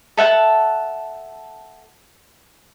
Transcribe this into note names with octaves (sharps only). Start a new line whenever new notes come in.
A4 E5 F#5 A5